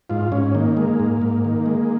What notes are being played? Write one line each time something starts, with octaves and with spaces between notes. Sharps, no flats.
G#2 F4
G#2 C#4
D#3 A#3
G#3 A#3
G#2
G#2
D#3
G#3